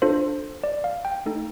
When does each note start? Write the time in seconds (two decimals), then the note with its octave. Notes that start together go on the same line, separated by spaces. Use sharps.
0.02 D4 F4 A4 C5
0.64 D5
0.84 F5
1.05 G5
1.26 A3 D#4 A4